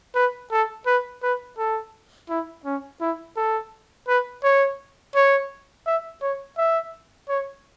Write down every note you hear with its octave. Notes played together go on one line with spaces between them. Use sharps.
B4
A4
B4
B4
A4
E4
C#4
E4
A4
B4
C#5
C#5
E5
C#5
E5
C#5